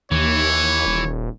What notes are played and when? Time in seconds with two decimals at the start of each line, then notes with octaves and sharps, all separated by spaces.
0.11 D#2 E3 C#5
0.86 D#1